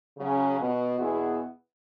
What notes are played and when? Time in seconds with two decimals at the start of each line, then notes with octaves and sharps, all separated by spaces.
0.18 C#3 F#3 C#4
0.59 B2 B3 F#4
0.99 E2 B2 B3 E4 G#4